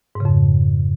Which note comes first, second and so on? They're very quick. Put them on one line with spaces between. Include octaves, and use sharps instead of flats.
G#2 C#3 F2